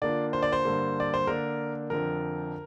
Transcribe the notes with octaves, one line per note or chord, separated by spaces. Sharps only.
D3 A#3 D4 F4 D5
C5
D5
C5
G2 D3 A#3
D5
C5
D3 A#3 D4 A#4
F2 D3 F3 D4 A#4